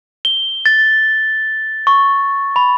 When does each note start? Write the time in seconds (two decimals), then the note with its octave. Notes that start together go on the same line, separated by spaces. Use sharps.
0.25 G7
0.66 A6
1.87 C#6
2.56 B5